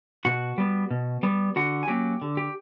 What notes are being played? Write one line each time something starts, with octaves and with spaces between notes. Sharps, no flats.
B2 F#4 F#5
G3 B3
B2
G3 B3
D3 F#4 F#5
G#5
F#3 A#3 C#4 G4 G5
D3
G4 G5